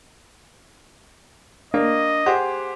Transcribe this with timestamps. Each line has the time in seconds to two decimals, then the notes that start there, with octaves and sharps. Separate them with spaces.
1.74 A#3 D4 D#5
2.26 G4 G#4 C5 F#5